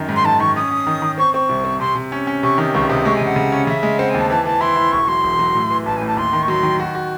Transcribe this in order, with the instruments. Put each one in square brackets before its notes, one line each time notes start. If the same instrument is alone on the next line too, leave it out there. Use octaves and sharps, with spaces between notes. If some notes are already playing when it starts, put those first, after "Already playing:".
Already playing: [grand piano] F#2 D#3
G#2
[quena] C6
[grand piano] D#3 [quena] A5
[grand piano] D#3 [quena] C#6
[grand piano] C#4 [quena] D#6
[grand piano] C#4
D#3
D#3
[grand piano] C4 [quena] C#6
[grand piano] C4 [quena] C#6
[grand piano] C2
C4
[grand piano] C3 [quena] C6
[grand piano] C3
C#4
C#4
[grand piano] C3 [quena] C#6
[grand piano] D#3 [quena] D#6
[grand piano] C#2 [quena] C#6
[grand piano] C3 [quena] D#6
[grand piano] G#3 [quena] C#6
[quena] G#5
[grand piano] C#3 [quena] F#5
[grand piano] C#3
C#4
[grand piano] C#3 [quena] E5
[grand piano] G#3
[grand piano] C4 [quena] F#5
[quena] G#5
[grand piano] D#2
[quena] A5
[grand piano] E3 [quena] A5
[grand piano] E3 [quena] A5
[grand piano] E4 [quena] C6
[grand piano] E4
[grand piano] E1 [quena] C#6
[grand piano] F#3 [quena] C6
[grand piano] E1
F#3
A2
E3
[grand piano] A1 [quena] A5
[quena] G#5
[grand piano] A2
[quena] A5
[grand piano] D#2 [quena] C6
[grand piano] D#3
[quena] C#6
[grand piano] F#3 [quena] C6
[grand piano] D#3
F#4
F#4